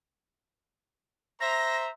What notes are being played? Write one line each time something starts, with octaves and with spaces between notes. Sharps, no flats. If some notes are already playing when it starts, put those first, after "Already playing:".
C5 E5 A#5 A#6